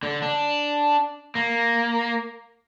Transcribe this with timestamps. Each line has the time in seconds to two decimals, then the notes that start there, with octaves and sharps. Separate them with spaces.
0.03 D3
0.22 D4
1.35 A#3